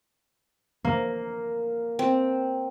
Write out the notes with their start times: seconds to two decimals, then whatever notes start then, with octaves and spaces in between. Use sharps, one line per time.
0.84 A#3
1.99 C4